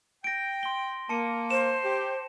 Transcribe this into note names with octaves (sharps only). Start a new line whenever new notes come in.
G5 A#6 D7
C6 G7
A#3 A5 C#7 D#7
C5 E7
G4